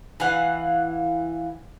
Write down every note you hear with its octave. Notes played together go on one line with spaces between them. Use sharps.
E3 F5 F#5